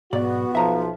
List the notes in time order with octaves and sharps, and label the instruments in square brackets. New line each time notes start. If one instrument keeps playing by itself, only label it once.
[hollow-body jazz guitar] B1 G#2 D5 [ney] B3 [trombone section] F#4
[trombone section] B1 F3 [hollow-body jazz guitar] E5 A#5